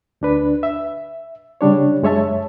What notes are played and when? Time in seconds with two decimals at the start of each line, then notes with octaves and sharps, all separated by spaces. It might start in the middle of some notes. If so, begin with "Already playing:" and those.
0.21 D2 D4 B4
0.63 E5
1.61 C#3 G3 D4 C#5
2.03 F#2 G#3 C#5 E5 A5